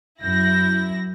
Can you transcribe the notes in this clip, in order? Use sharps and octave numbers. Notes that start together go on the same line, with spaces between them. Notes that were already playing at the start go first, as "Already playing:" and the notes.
F#2 E4 G6 A#6